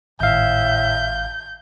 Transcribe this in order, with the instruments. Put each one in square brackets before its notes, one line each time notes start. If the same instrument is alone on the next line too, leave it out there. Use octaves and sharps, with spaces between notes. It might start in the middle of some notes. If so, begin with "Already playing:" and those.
[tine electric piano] G#1 F5 [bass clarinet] A2 [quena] E5 [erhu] G6